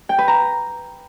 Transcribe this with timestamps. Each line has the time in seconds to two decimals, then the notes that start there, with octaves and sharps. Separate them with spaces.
0.09 G5
0.18 B4
0.28 A#5